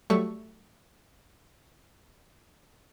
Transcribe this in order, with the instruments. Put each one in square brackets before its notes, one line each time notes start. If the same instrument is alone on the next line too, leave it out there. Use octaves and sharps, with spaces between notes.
[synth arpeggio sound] F#3 G3 A3 A4 E5 C#6